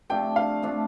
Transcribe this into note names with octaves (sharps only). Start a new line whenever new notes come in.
C3 F3 A3 D4 G5
F5
C3 F3 A3 D4